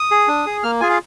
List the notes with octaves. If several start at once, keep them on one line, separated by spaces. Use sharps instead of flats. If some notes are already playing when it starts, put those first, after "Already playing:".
Already playing: D#6
G#4
D4
G#4
A#3 F6
F4 G#4 G#5
F5